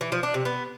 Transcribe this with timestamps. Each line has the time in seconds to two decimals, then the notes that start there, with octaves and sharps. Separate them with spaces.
0.01 E3
0.12 F3
0.23 D4
0.34 C3
0.45 B3